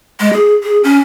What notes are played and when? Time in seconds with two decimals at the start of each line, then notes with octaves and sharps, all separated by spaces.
0.20 G#3
0.33 G#4
0.63 G#4
0.84 C#4